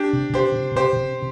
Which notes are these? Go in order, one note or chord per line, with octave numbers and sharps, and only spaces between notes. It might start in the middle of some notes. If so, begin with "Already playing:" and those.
Already playing: D4 G4
C3
C3 G4 C5
C3
C3 G4 C5
C3